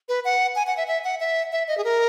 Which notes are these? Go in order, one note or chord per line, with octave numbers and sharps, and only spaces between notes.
B4
F#5
G#5
F#5
E5
E5
F#5
E5
E5
D#5
G#4
A#4